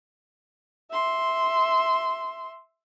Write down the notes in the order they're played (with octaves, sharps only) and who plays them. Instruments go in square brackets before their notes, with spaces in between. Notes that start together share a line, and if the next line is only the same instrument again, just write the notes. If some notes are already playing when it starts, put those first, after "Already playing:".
[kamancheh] E5 C6